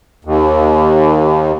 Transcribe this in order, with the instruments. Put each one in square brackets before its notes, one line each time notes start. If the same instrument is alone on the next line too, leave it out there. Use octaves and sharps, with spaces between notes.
[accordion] D#2